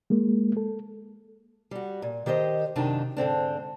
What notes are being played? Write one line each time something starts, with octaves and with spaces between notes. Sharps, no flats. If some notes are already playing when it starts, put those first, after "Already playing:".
G#3 A#3
A4
G3 F#4
A#2
D#3 G4 C5 D#5
F#2 C3 D#3 D4 D#4 A5
G#2 D3 C4 D4